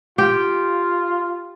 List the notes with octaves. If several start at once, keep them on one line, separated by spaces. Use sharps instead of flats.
F4 G4